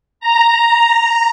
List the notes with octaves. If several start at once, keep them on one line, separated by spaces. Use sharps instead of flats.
A#5